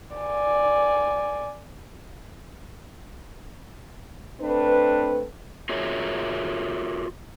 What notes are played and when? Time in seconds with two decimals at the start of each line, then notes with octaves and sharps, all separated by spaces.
0.17 D5 G#5
4.41 A3 C4 D4 B4
5.69 F4 F#4 G#4 A#4 C#5 E5